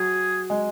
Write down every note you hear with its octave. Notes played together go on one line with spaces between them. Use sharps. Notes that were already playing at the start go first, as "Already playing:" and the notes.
Already playing: F#3 G#4
G#3